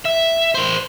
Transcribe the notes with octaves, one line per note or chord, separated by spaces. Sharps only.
E5
A#4 C5